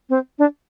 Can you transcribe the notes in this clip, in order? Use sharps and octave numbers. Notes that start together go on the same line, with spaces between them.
C4
D4